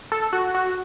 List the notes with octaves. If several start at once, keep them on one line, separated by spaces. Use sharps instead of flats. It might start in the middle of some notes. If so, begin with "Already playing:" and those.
A4
F#4
F#4